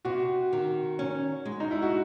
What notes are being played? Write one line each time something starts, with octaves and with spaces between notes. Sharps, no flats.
C3 F#4
D#3
C#4
G#3
D#4
E4
F#4